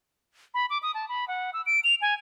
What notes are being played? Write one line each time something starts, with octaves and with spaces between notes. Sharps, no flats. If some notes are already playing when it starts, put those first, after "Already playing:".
B5
D6
D#6
A5
B5
F#5
E6
D7
F7
G#5